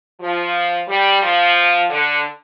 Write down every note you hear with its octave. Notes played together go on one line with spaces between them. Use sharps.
F3
G3
F3
D3